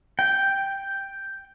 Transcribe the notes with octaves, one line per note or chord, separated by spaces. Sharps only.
G5